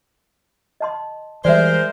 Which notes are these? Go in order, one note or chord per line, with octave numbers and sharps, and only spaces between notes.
D#5 A5 C6
E3 G3 G#3 A#4 C5 D5 E5